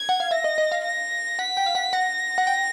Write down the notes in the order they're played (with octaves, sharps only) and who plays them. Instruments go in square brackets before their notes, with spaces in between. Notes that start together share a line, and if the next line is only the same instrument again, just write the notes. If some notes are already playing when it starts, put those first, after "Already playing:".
Already playing: [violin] G#6
[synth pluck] F#5
F5
[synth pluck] E5 [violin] A#6
[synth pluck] D#5
D#5
F5
[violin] A#6
[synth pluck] F#5 [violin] B6
[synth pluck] G5
F5
F#5
[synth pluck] F#5 [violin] A#6
[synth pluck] F#5
G5